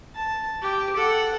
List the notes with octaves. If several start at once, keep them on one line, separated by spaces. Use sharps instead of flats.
A5
G4 D6
A4 F#5